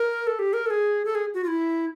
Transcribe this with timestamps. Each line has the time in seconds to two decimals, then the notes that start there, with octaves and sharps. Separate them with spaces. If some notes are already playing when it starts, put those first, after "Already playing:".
Already playing: A#4
0.27 A4
0.39 G4
0.53 A#4
0.66 A4
0.70 G#4
1.05 A4
1.15 G#4
1.34 F#4
1.44 F4
1.48 E4